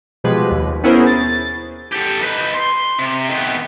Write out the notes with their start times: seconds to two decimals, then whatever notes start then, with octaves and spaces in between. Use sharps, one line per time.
0.24 B2 F3 G3 G#3 B4
0.51 D#2
0.84 B3 C#4 E4 G#4 A#4 C5
1.07 A6
1.92 G4 A4
2.21 D#4 B4
2.54 C6
2.99 C3
3.30 D#3 B3